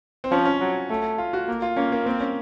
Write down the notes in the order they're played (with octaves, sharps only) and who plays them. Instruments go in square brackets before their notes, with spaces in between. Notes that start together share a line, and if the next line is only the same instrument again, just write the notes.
[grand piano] C4
[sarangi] F3 [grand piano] C#4
[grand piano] C#4
[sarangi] F#3
A3
[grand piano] F4
F#4
[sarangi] A#3
[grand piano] F4
[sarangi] A#3 [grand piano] C#4
[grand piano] A#3
[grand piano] A#3 [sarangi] C4
[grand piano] C#4